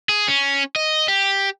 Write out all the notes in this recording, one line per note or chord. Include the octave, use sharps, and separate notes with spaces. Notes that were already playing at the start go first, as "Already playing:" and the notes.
G#4
C#4
D#5
G4